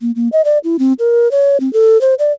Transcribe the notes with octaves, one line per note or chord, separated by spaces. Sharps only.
A#3
A#3
D#5
D5
E4
C4
A#4
C#5
C4
A4
C5
D5